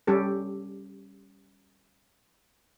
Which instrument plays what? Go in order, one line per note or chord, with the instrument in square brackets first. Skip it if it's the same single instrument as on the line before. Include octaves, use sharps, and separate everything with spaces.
[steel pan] G3 C#4 G4 A4